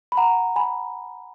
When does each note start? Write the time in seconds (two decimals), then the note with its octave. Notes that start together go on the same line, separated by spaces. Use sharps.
0.12 B5
0.17 F#5 A#5
0.56 G#5 B5